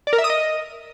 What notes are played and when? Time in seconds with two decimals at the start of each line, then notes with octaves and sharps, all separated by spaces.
0.07 D5
0.13 A#4
0.18 E5
0.24 D#6
0.30 D#5